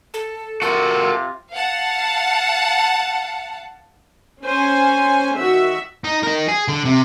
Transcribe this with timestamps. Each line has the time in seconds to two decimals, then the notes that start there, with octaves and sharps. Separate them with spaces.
0.14 A4
0.62 C3 F4 F#4 A4 A#4
1.52 F5 F#5 A5
4.44 C#4 C5 G#5
5.36 D#3 F#4 E5
6.04 D#4
6.23 D#4 A#4
6.48 G#4
6.68 D3
6.85 C3